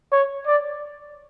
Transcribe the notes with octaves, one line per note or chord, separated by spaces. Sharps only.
C#5
D5